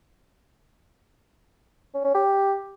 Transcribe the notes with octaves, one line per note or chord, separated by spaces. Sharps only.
C#4
C#4
G4